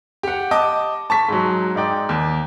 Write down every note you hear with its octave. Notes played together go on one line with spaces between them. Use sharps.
G4 F#5
D#5 A5 D6 D#6
A5 C#6 B6
G#2 F#3
G#2 D#4 D5 G5
D#2